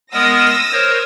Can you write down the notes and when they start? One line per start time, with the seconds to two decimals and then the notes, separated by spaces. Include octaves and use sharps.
0.13 G#3 B3 A#4 D#6 E6 A#6
0.72 A#4 C5 C#5